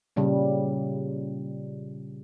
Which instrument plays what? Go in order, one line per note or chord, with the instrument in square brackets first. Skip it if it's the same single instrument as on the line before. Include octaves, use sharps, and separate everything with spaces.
[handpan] A#2 C#3 G3